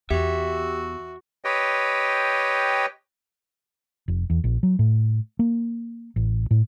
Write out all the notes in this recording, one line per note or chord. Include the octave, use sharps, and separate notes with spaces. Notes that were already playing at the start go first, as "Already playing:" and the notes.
E2 F#4 G4 E5
G4 B4 C#5 D#5 G5
F1
E2
A#1
F#3
A2
A#3
A1
A2